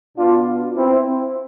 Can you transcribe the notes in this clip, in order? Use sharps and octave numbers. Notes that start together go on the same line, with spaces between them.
B2 B3 D4 F4
C4 E4